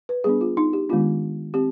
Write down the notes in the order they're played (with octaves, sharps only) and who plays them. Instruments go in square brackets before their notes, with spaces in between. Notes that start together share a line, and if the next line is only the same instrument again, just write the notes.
[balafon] B4
G3 B3 D4 G#4
F4
D#4
G4
D#3 G#3 B3 D4 F4
C4 G4